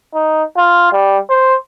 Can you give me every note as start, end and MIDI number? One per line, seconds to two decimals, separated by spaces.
0.14 0.44 63
0.57 0.89 65
0.92 1.18 55
1.30 1.54 72